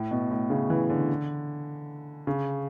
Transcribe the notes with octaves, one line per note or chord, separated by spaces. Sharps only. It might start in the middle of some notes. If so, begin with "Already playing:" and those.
Already playing: A2
B2
A2
C#3
E3
D3
C#3